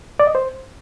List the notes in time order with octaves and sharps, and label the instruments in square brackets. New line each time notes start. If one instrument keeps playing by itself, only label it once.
[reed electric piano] D5
D#5
C5